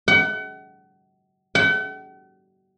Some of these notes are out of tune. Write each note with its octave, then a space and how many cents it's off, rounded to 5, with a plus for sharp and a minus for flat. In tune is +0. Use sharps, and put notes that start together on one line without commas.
F#5 +35
F#5 +45